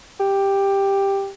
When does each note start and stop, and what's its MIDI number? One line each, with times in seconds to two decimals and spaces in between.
0.20 1.30 67